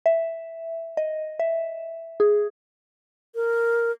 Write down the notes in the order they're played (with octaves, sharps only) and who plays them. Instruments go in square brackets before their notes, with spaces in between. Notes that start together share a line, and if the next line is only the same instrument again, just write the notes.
[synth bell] E5
D#5
E5
G#4
[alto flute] A#4